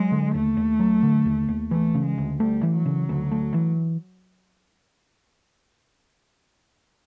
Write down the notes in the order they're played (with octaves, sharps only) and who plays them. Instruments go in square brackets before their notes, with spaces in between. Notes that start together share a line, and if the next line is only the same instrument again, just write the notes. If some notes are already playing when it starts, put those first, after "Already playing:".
Already playing: [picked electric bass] F#3 [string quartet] G#3
[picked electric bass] D3
[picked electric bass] D#2 [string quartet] A3
[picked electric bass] D#2
F#3
D3
D#2
D#2
[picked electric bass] E3 [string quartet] A3
[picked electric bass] C#3
[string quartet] G#3
[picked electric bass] D2
[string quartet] G3 [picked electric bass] A3
[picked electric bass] E3
[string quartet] F#3
[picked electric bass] C#3
D2
A3
E3